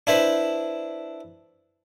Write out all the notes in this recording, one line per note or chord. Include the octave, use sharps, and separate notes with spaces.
D4 E4 B4 C5